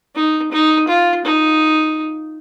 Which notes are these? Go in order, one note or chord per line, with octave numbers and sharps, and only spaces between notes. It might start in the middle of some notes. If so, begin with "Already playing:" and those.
D#4
D#4
F4
D#4